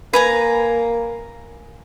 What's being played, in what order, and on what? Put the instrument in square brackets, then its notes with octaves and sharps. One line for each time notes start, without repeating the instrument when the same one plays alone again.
[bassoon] A#3 [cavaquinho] B4 G#5 A#5